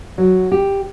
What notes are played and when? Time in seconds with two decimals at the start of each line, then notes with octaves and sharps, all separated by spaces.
0.18 F#3
0.52 G4